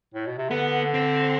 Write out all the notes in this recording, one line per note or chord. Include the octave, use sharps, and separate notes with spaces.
A2
B2
C3
D3 B3
C4